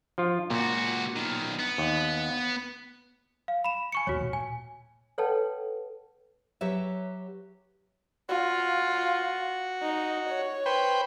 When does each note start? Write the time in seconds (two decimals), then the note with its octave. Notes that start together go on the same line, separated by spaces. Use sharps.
0.18 F3 F4
0.50 C#2 A#2 F#4
1.16 B1 D#3
1.59 B3
1.78 D#2
3.48 F5
3.64 B5 E7
3.92 G#5 C#6 C#7
4.07 D#2 A3 F#4 C#5
4.21 A#2
4.33 G#5
5.18 A4 B4 C#5 F#5 G5 A5
6.61 F#3 G4 B4 C#5 E5
8.29 F4 F#4
9.82 D#4
10.29 C#5
10.66 B4 C5 G5